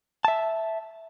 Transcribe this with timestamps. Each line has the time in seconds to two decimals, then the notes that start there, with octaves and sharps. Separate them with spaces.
0.25 E5 A5